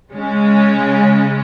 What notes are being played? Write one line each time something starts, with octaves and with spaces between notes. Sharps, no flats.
C#3 G#3 C#4